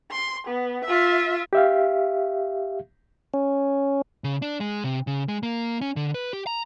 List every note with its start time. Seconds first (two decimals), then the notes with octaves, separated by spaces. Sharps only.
0.11 C6
0.47 B3
0.85 F4 E5
1.53 G4 E5 F5
3.34 C#4
4.24 C#3
4.42 D4
4.60 G#3
4.84 C3
5.07 C#3
5.28 G#3
5.43 A#3
5.81 C#4
5.96 D3
6.14 B4
6.33 G4
6.47 A#5